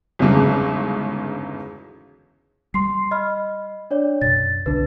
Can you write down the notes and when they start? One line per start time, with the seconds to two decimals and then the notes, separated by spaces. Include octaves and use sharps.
0.19 G1 E2 G#2 C#3 F#3
2.74 G3 C6 C7
3.11 D#5 B5 F6
3.91 D4 C#5 D5
4.22 F#2 B2 A6
4.66 C2 D3 D4 B4